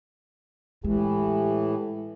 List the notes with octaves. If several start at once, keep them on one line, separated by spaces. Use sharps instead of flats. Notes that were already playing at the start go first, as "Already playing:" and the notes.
A2 E3 G#3 G4